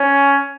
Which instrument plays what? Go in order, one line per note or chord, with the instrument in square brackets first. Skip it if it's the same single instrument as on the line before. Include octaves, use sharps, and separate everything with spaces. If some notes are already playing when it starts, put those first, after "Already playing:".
Already playing: [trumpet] C#4